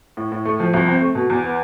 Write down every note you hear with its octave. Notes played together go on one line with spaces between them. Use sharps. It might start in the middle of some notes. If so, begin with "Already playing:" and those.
A2
A2
A3
F3
C2
C4
A3
B2
E2
B3